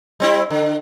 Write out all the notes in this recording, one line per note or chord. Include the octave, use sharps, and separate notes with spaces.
G3 C4 E4
D3